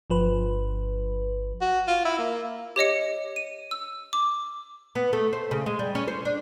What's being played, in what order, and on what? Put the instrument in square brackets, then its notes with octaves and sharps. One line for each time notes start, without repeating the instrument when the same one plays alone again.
[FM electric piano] G1 F3 B4
[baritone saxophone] F#4
F4
E4
A#3
[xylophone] G4 C#5 D#5 C#7
D#7
E6
D6
[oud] B3
A3
C5
C#3
G#3
G3
C#4
C5
D4